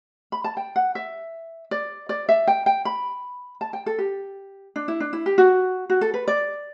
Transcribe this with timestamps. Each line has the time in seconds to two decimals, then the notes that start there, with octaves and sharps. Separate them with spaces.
0.32 B5
0.44 A5
0.57 G5
0.76 F#5
0.95 E5
1.71 D5
2.09 D5
2.29 E5
2.47 G5
2.66 G5
2.85 B5
3.61 A5
3.73 G5
3.86 A4
3.98 G4
4.76 D4
4.88 E4
5.00 D4
5.13 E4
5.26 G4
5.38 F#4
5.90 F#4
6.01 A4
6.14 B4
6.28 D5